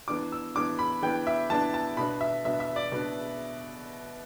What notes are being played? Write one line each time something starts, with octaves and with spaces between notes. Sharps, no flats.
E3 B3 D4 D6
E6
E3 B3 D4 D6
B5
E3 B3 D4 G5
E5
E3 B3 D4 A5
A5
B2 B3 D4 B5
E5
B2 B3 D4 E5
E5
D5
B2 B3 D4